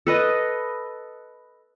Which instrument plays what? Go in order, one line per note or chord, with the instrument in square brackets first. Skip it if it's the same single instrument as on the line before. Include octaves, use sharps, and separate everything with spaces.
[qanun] A4 B4 D#5